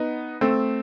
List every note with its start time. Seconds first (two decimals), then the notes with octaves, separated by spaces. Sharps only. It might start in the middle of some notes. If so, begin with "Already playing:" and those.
Already playing: B3 D#4
0.41 A3 C4